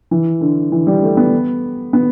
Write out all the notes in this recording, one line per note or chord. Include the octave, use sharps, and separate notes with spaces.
E3
D3
E3
G3
A3
B3
B3